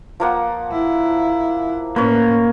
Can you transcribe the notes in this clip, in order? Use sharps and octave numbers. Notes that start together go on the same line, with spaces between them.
F3 A#3 F#5
E4
A2 A#3 C#4 B4 C#5